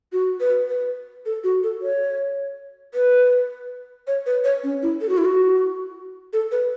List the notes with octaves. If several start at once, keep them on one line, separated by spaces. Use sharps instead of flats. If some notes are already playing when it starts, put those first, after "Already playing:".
F#4
B4
B4
A4
F#4
A4
C#5
B4
C#5
B4
C#5
C#4
E4
A4
F#4
E4
F#4
A4
B4